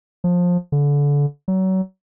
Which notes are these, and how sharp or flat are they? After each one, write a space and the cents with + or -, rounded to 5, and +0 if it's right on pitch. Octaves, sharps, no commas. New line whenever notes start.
F3 +20
D3 -30
F#3 +30